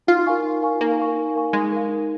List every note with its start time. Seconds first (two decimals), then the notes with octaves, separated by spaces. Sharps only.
0.07 D#4 F4
0.26 A#4 F5 G#5 C#6
0.44 D#4
0.62 A#4 F5 G#5 C#6
0.81 A#3 D#4
0.98 A#4 F5 G#5 C#6
1.16 D#4
1.35 A#4 F5 G#5 C#6
1.53 G#3 D#4
1.72 A#4 F5
1.89 D#4